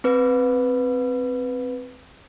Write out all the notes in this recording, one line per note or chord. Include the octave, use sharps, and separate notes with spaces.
C4 B4